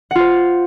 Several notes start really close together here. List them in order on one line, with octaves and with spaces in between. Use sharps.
F#5 F4 C5